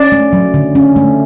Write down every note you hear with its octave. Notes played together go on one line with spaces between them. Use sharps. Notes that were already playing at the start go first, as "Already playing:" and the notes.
Already playing: C#4 D5
A3
F#3
D3
C#4
A3